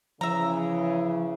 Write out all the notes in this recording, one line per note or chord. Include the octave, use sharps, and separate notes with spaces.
C#3 E3 F3 E5 A#5